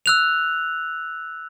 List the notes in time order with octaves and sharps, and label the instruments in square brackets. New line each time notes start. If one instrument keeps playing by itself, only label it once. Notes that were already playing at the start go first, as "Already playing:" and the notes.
[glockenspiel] E6 F#6 F7